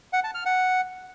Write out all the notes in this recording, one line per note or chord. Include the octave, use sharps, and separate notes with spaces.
F#5
A5
F6
F#5